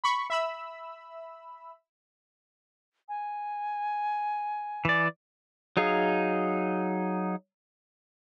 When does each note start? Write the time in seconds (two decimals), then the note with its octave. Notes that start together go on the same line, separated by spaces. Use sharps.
0.04 B5 C#6
0.30 E5 B5 E6
3.09 G#5
4.85 E3 D5
5.77 F#3 D#4 G#4 F5